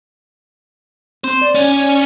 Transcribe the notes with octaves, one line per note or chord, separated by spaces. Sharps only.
C4 C5
D5
C#4